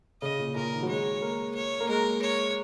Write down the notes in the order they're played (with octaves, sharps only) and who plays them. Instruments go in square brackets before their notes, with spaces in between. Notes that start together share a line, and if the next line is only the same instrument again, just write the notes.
[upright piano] C#3 [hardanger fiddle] D#5
[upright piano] A#2
[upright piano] A#2 [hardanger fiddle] A#4
[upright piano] D#3
F#3
[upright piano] G#3 [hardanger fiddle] C#5
[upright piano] A#3
[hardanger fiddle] C#5
[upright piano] A#3
[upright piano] G#3 [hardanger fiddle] A#4
[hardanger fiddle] C#5